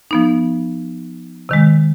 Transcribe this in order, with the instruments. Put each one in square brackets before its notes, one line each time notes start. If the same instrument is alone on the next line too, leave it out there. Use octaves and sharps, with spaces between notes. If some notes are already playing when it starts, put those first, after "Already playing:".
[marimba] F3 B3 D#4
C3 D#3 G#3